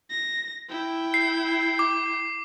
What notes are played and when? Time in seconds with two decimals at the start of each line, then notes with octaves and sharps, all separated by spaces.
0.10 A#6
0.69 E4 G5
1.14 C7
1.79 D6